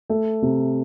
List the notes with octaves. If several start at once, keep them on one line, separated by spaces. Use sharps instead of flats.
A3
C3